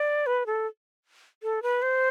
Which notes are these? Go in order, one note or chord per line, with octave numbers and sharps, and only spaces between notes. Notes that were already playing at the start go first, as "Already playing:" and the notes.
Already playing: D5
B4
A4
A4
B4
C5